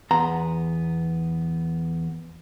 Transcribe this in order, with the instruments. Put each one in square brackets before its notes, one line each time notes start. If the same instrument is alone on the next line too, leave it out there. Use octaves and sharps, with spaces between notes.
[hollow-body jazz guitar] E2 B3 F#5 A#5 C6